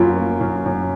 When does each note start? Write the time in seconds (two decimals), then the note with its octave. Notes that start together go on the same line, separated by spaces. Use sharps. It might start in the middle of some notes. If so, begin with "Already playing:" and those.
Already playing: F#2 A#3 F4
0.17 A#3
0.41 F#2
0.66 F#2